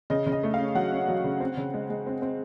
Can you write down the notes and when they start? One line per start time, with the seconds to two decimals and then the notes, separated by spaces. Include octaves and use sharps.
0.10 C#3 D#5
0.26 C#3
0.32 D#5
0.43 A3
0.54 F5
0.59 C#4
0.75 F#3 F#5
0.92 C#4
1.08 F#3
1.24 C#3
1.40 C4
1.57 C#3
1.74 G#3
1.90 G#3
2.06 C4
2.22 C4